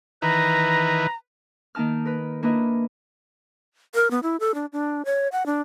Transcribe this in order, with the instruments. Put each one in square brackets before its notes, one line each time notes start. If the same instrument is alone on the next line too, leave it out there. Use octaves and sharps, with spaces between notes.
[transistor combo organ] D#3 E3 [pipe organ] B4 [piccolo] A#5
[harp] D#3 A#3 D#4 A5 F6
A#4 B4
A#3 D4 E4 A#4 B4 D#5
[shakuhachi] A#4
B3
E4
A4
D4
D4
C#5
F#5
D4